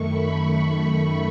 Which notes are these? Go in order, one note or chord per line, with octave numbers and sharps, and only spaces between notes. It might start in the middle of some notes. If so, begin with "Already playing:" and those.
Already playing: F#2 D#3 A3 C#6
B5